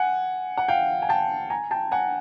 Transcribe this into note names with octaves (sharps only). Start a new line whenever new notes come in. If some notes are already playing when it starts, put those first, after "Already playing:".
Already playing: F#5 G#5
F#5
F5 G5
G#5
G5 A5
G#5 A#5
G5 A5
F#5 G#5